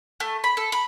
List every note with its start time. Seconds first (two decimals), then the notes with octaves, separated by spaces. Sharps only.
0.20 A3
0.44 B5
0.57 A4
0.72 B5